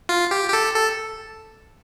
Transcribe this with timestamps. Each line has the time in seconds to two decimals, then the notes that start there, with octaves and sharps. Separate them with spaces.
0.09 F4
0.31 G4
0.49 G4
0.53 A4
0.76 A4